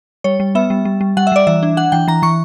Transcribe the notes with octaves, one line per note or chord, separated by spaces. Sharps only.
G3 C#5
G3
B3 E5
G3
G3
G3
G3 F#5
E5
G3 D5
E3 E5
D4
D4 F#5
E3 G5
E3 A#5
E3 C#6